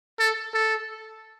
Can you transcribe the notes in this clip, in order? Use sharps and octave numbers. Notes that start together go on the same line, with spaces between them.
A4
A4